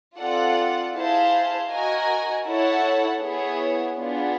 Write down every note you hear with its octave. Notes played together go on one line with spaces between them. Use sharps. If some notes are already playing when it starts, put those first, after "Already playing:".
C4 F4 A4 D5 F#5
E4 G#4 C5 F5 A5
F#4 A#4 D#5 G#5
E4 A4 C#5 F#5
B3 E4 G#4 C#5
B3 D4 F4 G#4